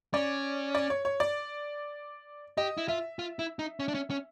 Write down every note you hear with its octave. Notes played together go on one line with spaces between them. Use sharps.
C#4 D5
D5
C#5
C#5
D5
G4 D#5
E4
F4 E5
F4
E4
D#4
C#4
D4
C#4
C#4